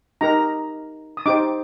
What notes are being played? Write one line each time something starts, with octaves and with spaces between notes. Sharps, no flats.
D#4 G4 A#4 A#5
D#6
D#4 G4 C5 D6